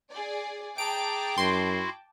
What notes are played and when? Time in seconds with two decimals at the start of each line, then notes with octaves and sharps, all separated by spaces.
0.10 G#4 D5
0.78 G#4 G5 A5 A#5 D6 D7
1.38 F#2 E4 F#4 C6